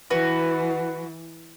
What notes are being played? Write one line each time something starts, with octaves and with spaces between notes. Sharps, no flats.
E3 F#4 B4